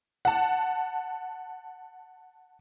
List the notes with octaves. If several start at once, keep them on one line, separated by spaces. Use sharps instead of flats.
F#5 A5